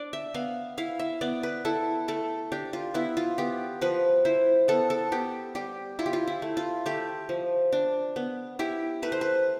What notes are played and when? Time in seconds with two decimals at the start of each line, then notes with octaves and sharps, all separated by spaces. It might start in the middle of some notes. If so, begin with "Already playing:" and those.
Already playing: D4 D5
0.13 E5
0.34 B3 F5
0.78 E4 F5
0.99 E5
1.21 B3 D5
1.43 B4
1.65 E4 A4
2.08 A3 A4
2.52 D4 G4
2.73 F4
2.94 B3 E4
3.17 F4
3.38 B3 G4
3.81 F3 B4
4.25 E4 C5
4.68 B3 A4
4.90 A4
5.12 B3 G4
5.55 G3 G4
5.99 E4 F4
6.06 G4
6.13 F4
6.28 E4
6.42 A3
6.57 F4
6.86 A3 G4
7.29 F3
7.72 D4
8.16 B3
8.59 E4 G4
9.02 A3 B4
9.12 C5
9.21 B4